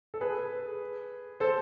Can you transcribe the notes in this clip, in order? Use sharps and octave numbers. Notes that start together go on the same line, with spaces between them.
A4
G#4 B4
A4 C5